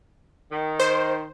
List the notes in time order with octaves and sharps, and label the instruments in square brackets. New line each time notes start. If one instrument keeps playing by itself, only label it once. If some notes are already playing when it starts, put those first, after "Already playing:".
[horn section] D#3
[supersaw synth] C5